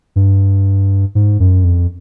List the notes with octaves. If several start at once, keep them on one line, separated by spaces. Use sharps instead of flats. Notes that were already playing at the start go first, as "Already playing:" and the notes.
G2
G#2
F#2
F2